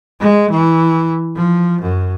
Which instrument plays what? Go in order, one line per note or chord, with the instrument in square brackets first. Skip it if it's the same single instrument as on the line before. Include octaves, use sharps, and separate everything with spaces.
[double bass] G#3
E3
F3
F#2